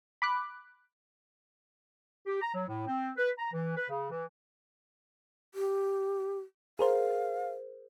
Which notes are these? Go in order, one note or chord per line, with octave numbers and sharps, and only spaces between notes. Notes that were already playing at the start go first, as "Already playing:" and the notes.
B5 D6 F#6
G4
A#5
F#3
A2
C4
B4
A#5
E3
B4
C#3
E3
G4
G#4 A#4 C5 F5